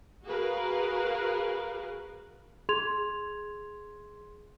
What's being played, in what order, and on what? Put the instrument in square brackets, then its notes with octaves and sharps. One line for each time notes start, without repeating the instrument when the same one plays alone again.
[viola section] F#4 G#4 A#4 B4 F5
[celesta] G#4 C6 G#6 F7